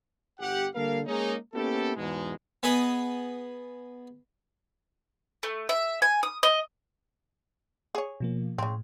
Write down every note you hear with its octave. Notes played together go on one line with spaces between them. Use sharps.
G1 G4 F#5
D3 G3 A#3 A4 A#4 F5
G#3 A#3 C#4 D#4
A#3 B3 C#4 E4 G4 A4
E2 G#2 B2 G#3
B3 G#4 D#5 B5
A3
E5
G#5
D#6
D#5
G#4 C#5
B2 F3 A#3
A2 C#3 C4